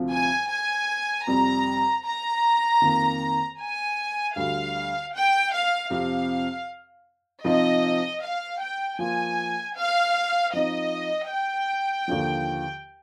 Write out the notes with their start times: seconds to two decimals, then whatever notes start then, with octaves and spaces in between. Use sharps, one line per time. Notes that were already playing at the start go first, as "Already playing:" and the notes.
Already playing: D2 C3 F3
0.11 G#5
0.50 G#5
1.27 F2 C3 G3 A#5
2.05 A#5
2.82 F2 D#3 A#3
3.59 G#5
4.36 D2 D3 G3 F5
5.13 G5
5.52 F5
5.90 F2 C3 F3 C4 G4 F5
7.44 C3 F3 C4 D#4 D#5
8.22 F5
8.61 G5
8.99 F3 A#3 F4 G#5
9.76 F5
10.53 F3 C4 D#4 D#5
11.30 G5
12.08 D#2 D3 F3